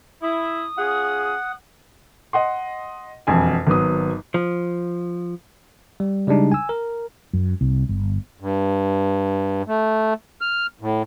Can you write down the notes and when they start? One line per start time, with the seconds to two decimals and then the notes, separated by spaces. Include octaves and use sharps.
0.22 E4 D#6
0.78 C#4 F4 G#4 F#5
2.33 D#5 F#5 C6
3.27 E1 F2 G#5
3.67 G#1 F#3 B3 D#6
4.34 F3
6.00 G3
6.27 C#3 G3 G#3 D4 D#4
6.52 G#5 E6
6.69 A#4
7.33 F#2
7.61 C2
7.89 G1
8.40 G2
9.68 A3
10.41 F6
10.81 A2